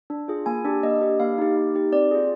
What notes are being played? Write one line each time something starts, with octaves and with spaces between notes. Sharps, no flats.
D4
F4 G#4
A#3 G#5
D4 G4
A#3 D#5
D4 G4
A#3 F5
D#4 G4
A#3
D#4 G4
C4 D5
F4 G#4